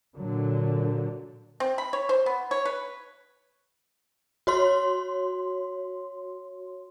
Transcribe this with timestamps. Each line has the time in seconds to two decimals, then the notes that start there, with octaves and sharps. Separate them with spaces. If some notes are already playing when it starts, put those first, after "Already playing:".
0.16 A#2 D3 F#3
1.60 C4
1.78 B5
1.93 C#5
2.09 C5
2.26 B3
2.51 C#5
2.65 B4
4.47 F#4 C#5 C6